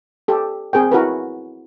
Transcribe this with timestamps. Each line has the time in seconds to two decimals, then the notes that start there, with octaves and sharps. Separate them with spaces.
0.28 G4 A4
0.73 C4 G#4 A#4 G5
0.92 E4 F#4 A#4 B4